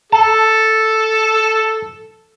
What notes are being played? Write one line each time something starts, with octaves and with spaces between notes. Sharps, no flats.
A4 A5